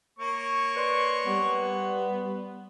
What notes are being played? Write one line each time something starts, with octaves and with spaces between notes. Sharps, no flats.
A#3 C#5 C#6
B4 D5 C6
G3 B3